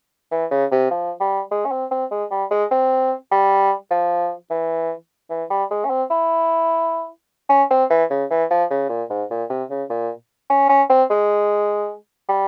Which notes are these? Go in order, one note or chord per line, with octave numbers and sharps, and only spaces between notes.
E3
C#3
C3
F3
G3
G#3
C#4
C4
C4
G#3
G3
G#3
C4
G3
F3
E3
E3
G3
G#3
C#4
C4
E4
C#4
C4
E3
C#3
E3
F3
C#3
A#2
G#2
A#2
C3
C#3
A#2
C#4
C#4
C4
G#3
G3